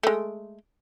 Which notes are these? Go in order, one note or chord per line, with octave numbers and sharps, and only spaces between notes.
G#3 A3